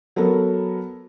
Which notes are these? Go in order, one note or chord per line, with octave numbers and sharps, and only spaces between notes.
F#3 B3 A4 A#4